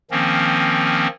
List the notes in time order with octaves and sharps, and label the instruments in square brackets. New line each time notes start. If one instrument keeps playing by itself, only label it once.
[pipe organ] D#3 F3 A#3 C4 C#4